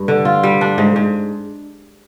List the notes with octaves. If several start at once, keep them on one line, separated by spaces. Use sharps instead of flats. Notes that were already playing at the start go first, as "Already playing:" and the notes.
Already playing: G2
D3
F4
G3
D4
G#2
G#2